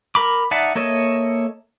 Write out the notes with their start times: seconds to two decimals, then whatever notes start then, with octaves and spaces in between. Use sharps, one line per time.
0.15 A#4 B5 D6
0.51 D#4 D5 E5 F#5 A5
0.75 A#3 A4 C#5 D#5 E5